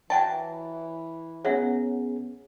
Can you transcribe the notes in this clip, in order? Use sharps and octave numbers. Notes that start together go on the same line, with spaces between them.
E3 F#3 G5 A5
F#3 B3 C#4 G#4 C#5 E5 F#5